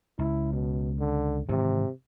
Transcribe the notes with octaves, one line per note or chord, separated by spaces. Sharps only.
C#2 E4
B2
D3
G#2 C3 D#3 E3